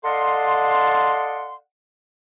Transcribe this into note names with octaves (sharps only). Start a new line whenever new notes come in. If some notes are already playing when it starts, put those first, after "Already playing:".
A4 D5 D#5 F5 F#5 C6